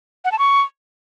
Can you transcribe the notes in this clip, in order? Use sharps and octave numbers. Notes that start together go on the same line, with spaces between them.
F#5
A5
C#6